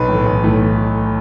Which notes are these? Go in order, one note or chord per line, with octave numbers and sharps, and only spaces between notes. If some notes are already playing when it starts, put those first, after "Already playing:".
Already playing: B1 B4
A2 E3 A3
B1
A2 E3 A3